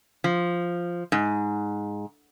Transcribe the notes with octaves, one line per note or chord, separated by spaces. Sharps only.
F3
G#2